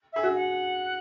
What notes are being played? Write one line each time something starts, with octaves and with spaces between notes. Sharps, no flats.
G#4 E5
F#4
F#5